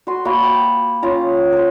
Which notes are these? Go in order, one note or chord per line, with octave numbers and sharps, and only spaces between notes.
F#4 C6
A#3 F#4 A#5 B5
G5
C#4 F4 A#5
A#4 C5